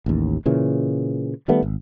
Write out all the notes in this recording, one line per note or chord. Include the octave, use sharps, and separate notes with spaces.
A1 D#2
A#2 C#3 E3
D#3 G3 A3 B3
G#1